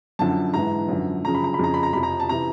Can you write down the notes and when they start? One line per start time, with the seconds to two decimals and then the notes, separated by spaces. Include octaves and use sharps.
0.19 F#2 D3 F3 A5
0.54 G#2 E3 A#5
0.89 F#2 D3 F3
1.24 F#2 C#3 F3 A#5
1.35 B5
1.44 A#5
1.54 B5
1.59 F2 C#3 F3 A#5
1.74 B5
1.83 A#5
1.93 F2 C3 F3 B5
2.03 A#5
2.20 A5
2.29 C3 E3 A#5